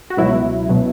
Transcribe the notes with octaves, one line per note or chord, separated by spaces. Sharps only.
F#4
C#2 B2 F#3 E4
B2 F#3